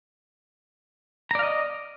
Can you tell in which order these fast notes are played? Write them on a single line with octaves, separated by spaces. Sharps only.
A#5 D5 F5 D#5